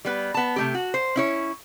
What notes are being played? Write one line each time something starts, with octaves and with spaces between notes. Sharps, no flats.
G3 B3 B4
B3 A5
C3 A3 G4
F#4
C5
C#4 E4 C#5